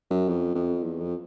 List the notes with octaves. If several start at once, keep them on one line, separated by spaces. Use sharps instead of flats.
F#2
F2
F2
E2
F2